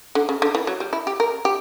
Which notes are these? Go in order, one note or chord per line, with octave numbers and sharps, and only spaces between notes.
D3
C#3
D3
E3
F#3
G3
E4
G4
A#4
G4